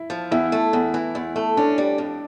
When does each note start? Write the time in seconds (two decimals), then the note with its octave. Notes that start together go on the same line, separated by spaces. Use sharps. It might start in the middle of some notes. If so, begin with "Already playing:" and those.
Already playing: E4
0.10 F3
0.31 E2 E4
0.52 A3
0.73 E2
0.94 E3
1.15 E2
1.36 A3
1.57 C#4 D4
1.78 G3
1.98 F2